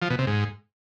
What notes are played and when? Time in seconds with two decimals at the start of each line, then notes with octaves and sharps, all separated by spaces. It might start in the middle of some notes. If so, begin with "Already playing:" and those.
0.02 F3
0.10 B2
0.19 C3
0.27 G#2